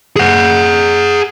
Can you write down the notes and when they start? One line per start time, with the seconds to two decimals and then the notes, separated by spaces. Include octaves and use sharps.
0.16 G#4 F#5